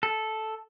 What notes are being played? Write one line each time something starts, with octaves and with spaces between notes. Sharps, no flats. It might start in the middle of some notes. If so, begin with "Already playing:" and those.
A4